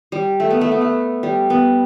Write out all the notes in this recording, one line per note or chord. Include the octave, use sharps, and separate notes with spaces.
G3
A3
B3
A3
B3
A3
G3
B3